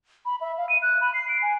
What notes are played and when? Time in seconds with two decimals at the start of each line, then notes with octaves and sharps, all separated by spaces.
0.26 B5
0.41 E5
0.58 F5
0.69 D#7
0.82 F#6
1.01 B5
1.14 C7
1.29 D7
1.42 G#5